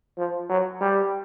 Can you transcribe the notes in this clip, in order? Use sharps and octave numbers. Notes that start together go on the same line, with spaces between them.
F3
F#3
G3